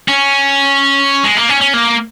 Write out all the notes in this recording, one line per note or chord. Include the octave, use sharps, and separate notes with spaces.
C#4
G#3
A#3
C#4
C#4
A#3